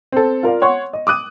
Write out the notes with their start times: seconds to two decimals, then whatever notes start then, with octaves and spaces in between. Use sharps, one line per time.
0.12 C4 A4
0.43 F4 A#4 D5 F5
0.62 C#5 F#5 C6 C#6
0.93 D#5
1.07 D6 D#6 F#6 D#7